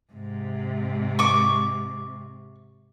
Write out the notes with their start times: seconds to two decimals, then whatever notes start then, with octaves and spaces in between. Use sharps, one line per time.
0.13 G#2 C3
1.19 C#6 D6